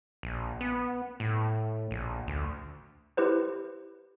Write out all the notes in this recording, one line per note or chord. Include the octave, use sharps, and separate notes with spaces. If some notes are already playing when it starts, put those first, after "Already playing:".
A#1
B3
A2
A#1
D2
E4 G4 B4 C5